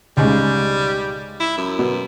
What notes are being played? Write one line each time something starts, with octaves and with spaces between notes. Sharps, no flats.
C#2 G#2 C#3 G3
E4
F#2
B2